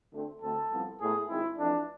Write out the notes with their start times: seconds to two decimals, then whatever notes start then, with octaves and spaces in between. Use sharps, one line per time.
0.13 D2 D3 A3 C4
0.42 D2 D3 A3 C4 A4
0.71 C2 C3 F3 B3
1.00 A2 G#3 B3 G#4
1.29 G#1 G#2 G#3 C4 E4
1.58 F2 E3 A3 D4